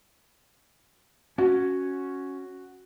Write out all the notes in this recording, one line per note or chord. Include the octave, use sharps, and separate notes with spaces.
C#4 F#4